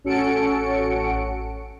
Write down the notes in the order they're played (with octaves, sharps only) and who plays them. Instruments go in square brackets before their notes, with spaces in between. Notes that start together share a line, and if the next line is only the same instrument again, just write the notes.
[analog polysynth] A1 C#4 F#4 A4 C#7 D7